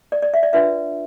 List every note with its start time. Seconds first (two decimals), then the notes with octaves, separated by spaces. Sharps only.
0.12 D5
0.22 D5
0.34 E5
0.43 D5
0.53 D4 F4 B4 E5